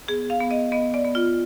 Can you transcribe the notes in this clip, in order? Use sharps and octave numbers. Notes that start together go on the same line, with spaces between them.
B3 G#4
F5
B3
D#5
B3 D#5
D5
B3
F4